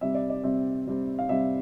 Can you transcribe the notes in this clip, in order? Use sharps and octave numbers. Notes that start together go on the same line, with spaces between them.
C3 G3 C4 E5
D5
D5
C3 G3 C4 E5
C3 G3 C4
F5
C3 G3 C4 E5